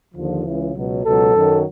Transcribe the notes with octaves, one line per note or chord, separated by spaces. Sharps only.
D#2 D3 F3
C#2 C#3 E3
C#2 B2 F#3
C#2 B2 F#3 A4
F#2 D#3 F#3